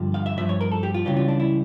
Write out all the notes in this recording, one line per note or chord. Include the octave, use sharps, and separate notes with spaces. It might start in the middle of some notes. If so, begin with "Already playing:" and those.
Already playing: G2 D3 F3
F5
E5
G2 F3 E5
C#5
A#4
A4
G4
F4
C#2 C#3 E3 G3 G4
F4
D4
E4